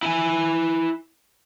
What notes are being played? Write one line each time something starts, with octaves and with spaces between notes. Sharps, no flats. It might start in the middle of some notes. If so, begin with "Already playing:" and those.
E4 G#5